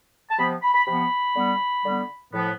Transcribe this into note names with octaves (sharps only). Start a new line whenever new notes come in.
A5
C3 F3 B3 B5
B5
B5
C3 F3 B3 B5
D3 G3 B3
D3 G3 B3
A2 F3 B3